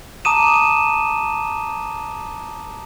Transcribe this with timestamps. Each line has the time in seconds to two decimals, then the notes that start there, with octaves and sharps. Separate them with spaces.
0.25 A5 A#5 D6 D#6 D#7 E7